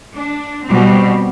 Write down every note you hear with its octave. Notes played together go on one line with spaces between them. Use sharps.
D4
B2 G3 C4